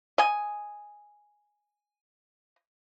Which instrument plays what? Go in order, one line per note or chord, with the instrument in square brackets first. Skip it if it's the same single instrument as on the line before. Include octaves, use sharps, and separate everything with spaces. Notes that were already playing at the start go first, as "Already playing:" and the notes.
[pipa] D#5 G#5